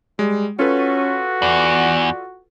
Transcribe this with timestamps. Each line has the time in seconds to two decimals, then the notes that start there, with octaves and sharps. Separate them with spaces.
0.19 G3 G#3
0.59 C#4 F4 F#4 A4 B4
1.42 E2 D5